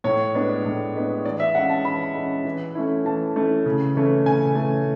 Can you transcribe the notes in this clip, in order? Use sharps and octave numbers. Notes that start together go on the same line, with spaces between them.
A2 C#5
G#3 B3 D4
A2
G#3 B3 D4
E3 D5
E5
G#3 C#4 F#5
A5
E3 B5
G#3 C#4
E3
A3 C#4 E4
E3 A5
A3 C#4 E4
C#3
E3 A3 C#4
C#3 G#5
E3 A3 C#4